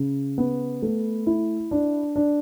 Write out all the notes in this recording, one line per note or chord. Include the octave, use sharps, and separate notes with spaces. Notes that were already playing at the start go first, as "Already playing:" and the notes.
Already playing: C#3
B3
A3
E4
D4
D4